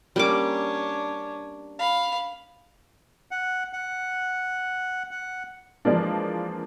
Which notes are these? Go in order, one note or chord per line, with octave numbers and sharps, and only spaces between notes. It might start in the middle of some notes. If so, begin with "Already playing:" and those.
G3 A#3 C#4 D4 D6
F5 B5
F#5
F#5
F#5
E3 F3 G#3 A#3 D4